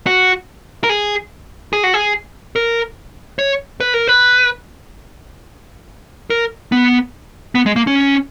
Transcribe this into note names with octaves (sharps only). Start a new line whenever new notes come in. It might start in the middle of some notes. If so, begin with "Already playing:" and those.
F#4
A#4
G#4
G#4
F#4
G#4
A#4
C#5
B4
A#4
B4
A#4
B3
B3
G#3
A#3
C#4